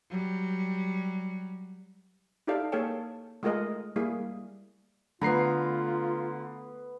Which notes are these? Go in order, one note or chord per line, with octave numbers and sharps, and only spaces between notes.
F#3 G3
D#4 E4 G4 A4 D5 F5
A#3 G#4 A4 C#5 G5 A5
G#3 A3 F4 G#4 A#4 D#5
G3 A#3 E4 G#4
D3 A3 B3 F4 B4 A#5 C7